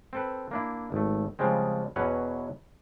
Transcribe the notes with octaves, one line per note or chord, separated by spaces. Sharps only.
C4 A4 B4
A#3 D4 E4
G#1 A3
C#3 F3 G3 G#3 C4
E2 B2 F#3 C#4 B4 C#5